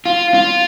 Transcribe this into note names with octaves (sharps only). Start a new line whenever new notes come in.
F4
F4